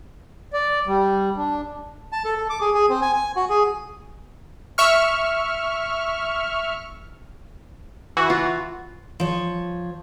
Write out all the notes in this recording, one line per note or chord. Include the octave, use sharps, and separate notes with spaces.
D5
G3
D4
A5
A4
A4
D6
G#4
G#4
C4
G#5
G#5
F#4
G#4
E5 C#6 F6
E3 F#4
F4
F3 C#5